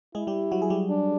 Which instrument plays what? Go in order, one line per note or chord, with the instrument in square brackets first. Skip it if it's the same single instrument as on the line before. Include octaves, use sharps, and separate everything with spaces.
[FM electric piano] G#3 G#4 [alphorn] E4
[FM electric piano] G3 G4
F#3 F#4
G#4
G3 G4
[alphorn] D4